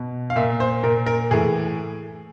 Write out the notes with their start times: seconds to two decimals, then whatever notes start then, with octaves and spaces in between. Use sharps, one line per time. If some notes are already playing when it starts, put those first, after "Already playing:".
Already playing: B2
0.30 F5
0.36 A#2 E5
0.60 C5
0.83 A#2 A#4
1.06 A#4
1.31 A2 E3 G#4